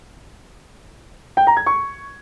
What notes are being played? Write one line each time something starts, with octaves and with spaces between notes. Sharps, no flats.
G5
A#5
G#6
C#6